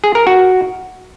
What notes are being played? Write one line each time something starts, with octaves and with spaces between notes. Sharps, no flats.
G#4
A#4
F#4